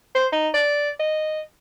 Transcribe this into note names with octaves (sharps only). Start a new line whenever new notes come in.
C5
D#4
D5
D#5